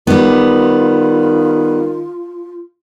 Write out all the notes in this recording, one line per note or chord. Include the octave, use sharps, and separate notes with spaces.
D#3 G3 B3 F4